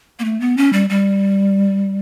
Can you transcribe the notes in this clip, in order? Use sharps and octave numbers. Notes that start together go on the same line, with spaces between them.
A#3
A3
B3
C#4
G3
G3